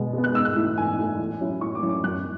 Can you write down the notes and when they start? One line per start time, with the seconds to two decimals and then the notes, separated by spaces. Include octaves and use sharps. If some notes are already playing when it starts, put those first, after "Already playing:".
Already playing: B2 G#3 B3
0.13 G#3 B3
0.24 F#6
0.35 G#2 E6
0.45 F#6
0.56 E3 A3 E4
0.77 G#2 G#5
0.98 E3 A3 E4
1.19 A2
1.41 F#3 C#4 E4
1.61 A2 C#6
1.75 D6
1.82 F#3 C#4 E4
1.89 D6
2.04 F#2 F#6